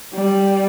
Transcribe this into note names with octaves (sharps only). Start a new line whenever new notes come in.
G3